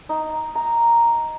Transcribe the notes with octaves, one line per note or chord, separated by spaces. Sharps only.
D#4
A#5